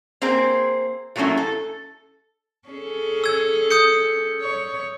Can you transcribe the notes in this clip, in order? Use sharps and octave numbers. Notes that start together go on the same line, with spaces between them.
A#3 C4 G#4 C5
F3 F#3 A3 A#3 C#4 E4
A4
C#4 G#4 A4
E6 G#6
D#6 G6 C#7
C#5